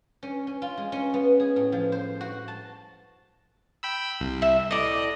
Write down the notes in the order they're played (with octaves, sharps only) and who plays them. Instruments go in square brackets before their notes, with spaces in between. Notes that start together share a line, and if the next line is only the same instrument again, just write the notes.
[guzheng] C#4
C#4
F4
G#3
C#4
B3
G#4
A2
F3
C5
F#4
A5
[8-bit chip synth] G5 B5 E6
C2
[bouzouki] E5
[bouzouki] A2 D5 [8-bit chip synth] D#5